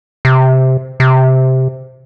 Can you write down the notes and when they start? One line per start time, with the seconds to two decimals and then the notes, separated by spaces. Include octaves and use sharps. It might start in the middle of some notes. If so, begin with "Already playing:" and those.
0.25 C3
1.00 C3